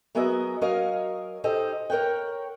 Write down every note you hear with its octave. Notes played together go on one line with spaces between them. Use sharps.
F#3 B3 G#4 A#4 D#5 E5
F#3 C#4 A#4 C#5 D#5 F5
D#4 G4 A4 C5 D#5
A#4 C#5 F#5 G5